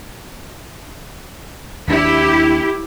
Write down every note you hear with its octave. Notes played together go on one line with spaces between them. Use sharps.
D#2 D4 E4 G4